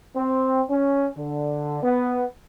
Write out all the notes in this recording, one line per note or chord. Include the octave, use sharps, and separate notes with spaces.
C4
C#4
D3
B3